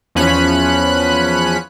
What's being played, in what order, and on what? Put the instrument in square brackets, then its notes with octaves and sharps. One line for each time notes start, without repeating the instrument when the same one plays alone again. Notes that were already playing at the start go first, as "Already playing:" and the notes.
[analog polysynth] E2 F3 C#4 B5 F#6